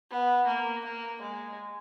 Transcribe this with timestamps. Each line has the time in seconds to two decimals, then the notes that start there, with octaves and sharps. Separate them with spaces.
0.10 B3
0.47 A#3
0.84 A#3
1.22 G#3